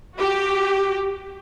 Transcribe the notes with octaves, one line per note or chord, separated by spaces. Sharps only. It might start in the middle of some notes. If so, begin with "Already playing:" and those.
F#4 G4